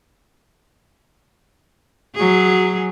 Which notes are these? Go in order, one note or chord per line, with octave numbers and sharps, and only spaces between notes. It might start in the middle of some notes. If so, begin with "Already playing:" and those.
F#3 G#4